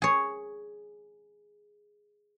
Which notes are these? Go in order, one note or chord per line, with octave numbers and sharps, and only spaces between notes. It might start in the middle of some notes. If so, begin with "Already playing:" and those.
G#4 C#5